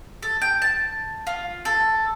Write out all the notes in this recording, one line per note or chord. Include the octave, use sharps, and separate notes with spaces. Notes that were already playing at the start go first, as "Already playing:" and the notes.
A4
G5
A5
F4
A4